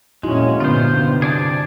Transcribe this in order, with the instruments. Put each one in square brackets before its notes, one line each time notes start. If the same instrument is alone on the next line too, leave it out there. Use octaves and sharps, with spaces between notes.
[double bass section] F2 A#2 C#4 [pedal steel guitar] G#3 [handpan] D#4 E4 F#4
[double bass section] G2 A#2 B3 [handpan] D3 [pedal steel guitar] F4 C5
[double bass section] C3
[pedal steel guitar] G#4 D5 A5